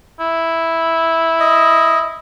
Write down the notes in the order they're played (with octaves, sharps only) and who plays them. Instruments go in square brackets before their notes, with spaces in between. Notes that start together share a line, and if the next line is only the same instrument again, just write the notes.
[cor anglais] E4
[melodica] D#5